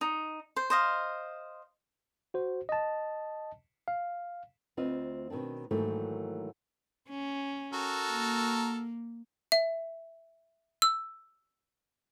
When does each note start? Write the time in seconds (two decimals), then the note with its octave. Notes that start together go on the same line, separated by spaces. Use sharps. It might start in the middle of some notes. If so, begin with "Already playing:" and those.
0.01 D#4
0.56 C5
0.70 C5 D#5 F5
2.34 F#4 C5
2.69 D#5 A5
3.88 F5
4.77 D2 C4 F4 B4 D#5
5.30 B2 D#3 C4 D4
5.71 G#2 D#3 E3 F#3 A3 A#3
7.09 C#4
7.73 F#4 A4 A#4
8.11 A#3
9.52 E5
10.82 E6